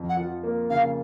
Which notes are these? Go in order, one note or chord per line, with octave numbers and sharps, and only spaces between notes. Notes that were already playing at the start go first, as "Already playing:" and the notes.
Already playing: F2
F#5
F3
A#3
C#3 F5